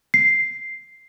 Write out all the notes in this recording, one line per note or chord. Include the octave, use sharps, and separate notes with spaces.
C7